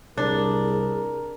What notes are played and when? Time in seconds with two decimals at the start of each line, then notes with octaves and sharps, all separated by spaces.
0.18 C2 D4 G#4 A#4